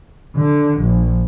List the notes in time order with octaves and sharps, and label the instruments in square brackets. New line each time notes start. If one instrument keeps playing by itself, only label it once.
[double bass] D3
A#1